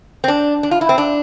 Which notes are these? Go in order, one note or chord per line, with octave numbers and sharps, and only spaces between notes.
C4
D4
D4
F4
E4
C4
D4